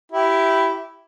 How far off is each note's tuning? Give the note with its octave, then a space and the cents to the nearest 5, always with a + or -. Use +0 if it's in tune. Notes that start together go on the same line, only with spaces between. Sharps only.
E4 +0 G4 -20